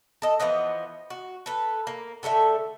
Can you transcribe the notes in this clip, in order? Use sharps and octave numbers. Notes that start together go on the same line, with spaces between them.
A4 D#5
E3 F3 B3 D#5
F#4
A4 B4
A#3
D3 A3 A4 E5